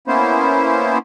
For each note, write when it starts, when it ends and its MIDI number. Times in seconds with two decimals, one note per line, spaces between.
0.08 0.98 58
0.08 0.98 59
0.08 0.98 61
0.08 0.98 64
0.08 0.98 72